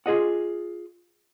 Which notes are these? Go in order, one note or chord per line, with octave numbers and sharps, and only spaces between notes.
F4 G#4 D#5 F#5